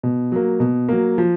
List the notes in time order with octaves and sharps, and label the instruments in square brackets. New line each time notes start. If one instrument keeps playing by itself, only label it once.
[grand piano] B2
F#3 A#3
B2
F#3 A#3
F3